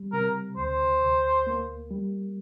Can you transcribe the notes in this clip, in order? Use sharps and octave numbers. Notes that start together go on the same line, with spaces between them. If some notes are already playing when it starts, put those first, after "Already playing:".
Already playing: G3
C3 A#4
D2 C5
D2
A#3
G3